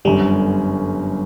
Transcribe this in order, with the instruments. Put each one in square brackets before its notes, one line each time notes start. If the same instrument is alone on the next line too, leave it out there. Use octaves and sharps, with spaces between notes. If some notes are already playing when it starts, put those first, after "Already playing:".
[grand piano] G1 F#2 D3 [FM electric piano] G3